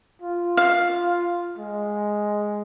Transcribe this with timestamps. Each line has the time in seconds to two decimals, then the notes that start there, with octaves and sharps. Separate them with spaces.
0.22 F4
0.57 F5
1.58 G#3